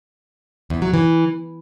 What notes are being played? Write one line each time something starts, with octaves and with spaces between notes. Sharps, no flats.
E2
F#3
E3